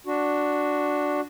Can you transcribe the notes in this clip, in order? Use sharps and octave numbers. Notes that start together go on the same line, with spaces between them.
D4 F#4